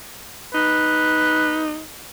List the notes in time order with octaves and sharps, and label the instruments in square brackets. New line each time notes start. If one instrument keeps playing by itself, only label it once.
[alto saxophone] D#4 [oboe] B4